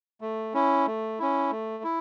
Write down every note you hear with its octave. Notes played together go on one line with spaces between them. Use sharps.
A3
C#4 E4
A3
C#4 E4
A3
E4